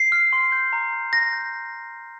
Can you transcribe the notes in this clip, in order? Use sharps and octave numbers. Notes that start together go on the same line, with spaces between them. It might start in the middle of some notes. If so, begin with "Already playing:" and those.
Already playing: C7
F6
C6
G6
A#5
G6
A#5 A#6
G6